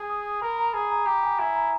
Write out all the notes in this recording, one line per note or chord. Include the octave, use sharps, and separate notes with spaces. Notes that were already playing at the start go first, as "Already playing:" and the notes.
Already playing: G#4
D#6
A#4 B5
A#5
G#4 B5
A#5
G4 A#5
G#5
E4 G#5
A#5